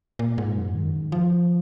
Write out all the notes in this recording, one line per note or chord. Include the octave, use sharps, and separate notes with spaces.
A#2
G#2
F#2
D#3
F3